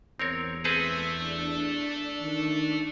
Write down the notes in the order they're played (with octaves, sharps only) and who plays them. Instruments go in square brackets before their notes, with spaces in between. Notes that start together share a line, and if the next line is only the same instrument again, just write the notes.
[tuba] E2 [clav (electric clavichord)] C4 A#4 C#5
[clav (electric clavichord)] C4 G#4 B4 [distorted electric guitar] A4 E5
[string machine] D4
[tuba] D#3